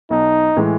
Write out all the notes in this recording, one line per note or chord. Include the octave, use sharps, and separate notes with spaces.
B1 D#4
A2 E3 G#3